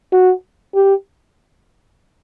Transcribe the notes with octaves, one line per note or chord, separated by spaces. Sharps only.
F#4
G4